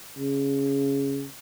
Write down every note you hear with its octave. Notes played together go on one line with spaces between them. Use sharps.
C#3